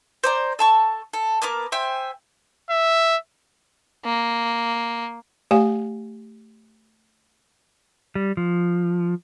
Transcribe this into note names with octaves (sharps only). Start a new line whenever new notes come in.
C5 D5 A#5
A4 A5 C#6
A4
A#3 B3 A#4 D6
C5 E5 G5 G#5
E5
A#3
A3 G4 D5 F5 G#5
G3
F3